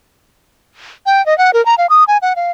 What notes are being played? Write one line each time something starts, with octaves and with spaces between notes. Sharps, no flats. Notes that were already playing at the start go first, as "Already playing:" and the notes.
G5
D#5
F#5
A#4
A#5
F5
D#6
G#5
F#5
F5